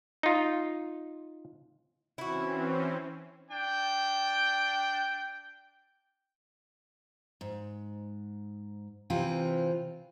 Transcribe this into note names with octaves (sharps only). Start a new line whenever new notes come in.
D#4 F4
E3 C4 C#4 E4 F#4
D4 G5
G#2
C3 E3 C4 F4